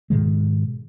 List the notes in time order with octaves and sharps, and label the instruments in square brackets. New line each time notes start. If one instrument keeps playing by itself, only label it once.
[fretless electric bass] G#2 B2 D#3 G#3